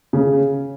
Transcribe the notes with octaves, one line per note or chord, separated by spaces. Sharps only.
C#3